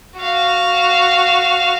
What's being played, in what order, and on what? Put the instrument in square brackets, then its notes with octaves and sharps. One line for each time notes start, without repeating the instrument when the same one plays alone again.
[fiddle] F#4 F5